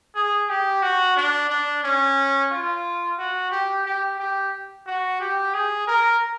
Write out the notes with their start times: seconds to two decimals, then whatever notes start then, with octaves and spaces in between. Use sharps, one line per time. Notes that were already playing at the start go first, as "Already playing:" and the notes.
0.15 G#4
0.49 G4
0.83 F#4
1.17 D4
1.50 D4
1.83 C#4
2.51 F4
3.18 F#4
3.51 G4
3.86 G4
4.20 G4
4.87 F#4
5.21 G4
5.54 G#4
5.88 A#4